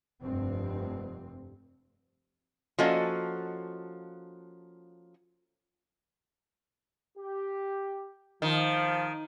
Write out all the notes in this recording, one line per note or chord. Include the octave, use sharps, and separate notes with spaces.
F1 G2 C4
F3 A#3 C#4 F#4 A4 D#5
G4
D#3 F3